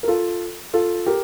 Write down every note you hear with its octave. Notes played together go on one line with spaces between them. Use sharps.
A#4
F4 A4
F4 A4
G4 A#4